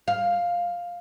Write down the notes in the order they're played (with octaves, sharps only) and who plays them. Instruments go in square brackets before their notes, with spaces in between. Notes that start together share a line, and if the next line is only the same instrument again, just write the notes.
[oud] F5